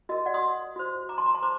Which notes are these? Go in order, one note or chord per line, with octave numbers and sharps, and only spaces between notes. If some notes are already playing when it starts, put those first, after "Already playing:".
F#4 A#4 D#5
D5 F#5
C6 D#6
F#4 C5
A#5 D6
A5 C6
A#5 D6
A5 C6
C5 A#5 D6